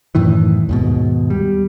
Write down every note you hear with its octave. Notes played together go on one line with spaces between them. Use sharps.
F#2 A2 D#3 E3
D#2 G#2 B2
G3